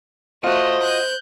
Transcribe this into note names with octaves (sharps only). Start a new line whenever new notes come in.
A3 F4 F#4 C5 D#5
F#6 G6